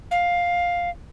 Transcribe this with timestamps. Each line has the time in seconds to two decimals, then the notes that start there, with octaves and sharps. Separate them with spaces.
0.11 F5